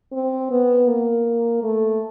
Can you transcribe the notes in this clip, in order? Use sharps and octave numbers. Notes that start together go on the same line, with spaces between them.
C4
B3
A#3
A3